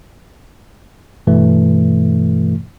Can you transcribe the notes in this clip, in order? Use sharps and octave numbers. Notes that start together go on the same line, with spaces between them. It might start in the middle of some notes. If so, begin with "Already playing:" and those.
G2 B2 E3 A3